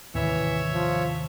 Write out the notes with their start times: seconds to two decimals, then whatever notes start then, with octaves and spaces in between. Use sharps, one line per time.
0.15 D#2 A2 C3 E3 C#5 E5
0.73 F3